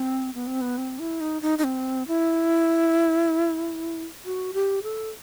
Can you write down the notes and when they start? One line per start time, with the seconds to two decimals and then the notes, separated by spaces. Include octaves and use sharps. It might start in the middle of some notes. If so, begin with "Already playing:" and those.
Already playing: C4
0.34 B3
0.47 C4
0.61 B3
0.78 C4
0.99 E4
1.21 D#4
1.42 D#4
1.58 D#4
1.64 C4
2.08 E4
4.25 F#4
4.53 G4
4.83 A4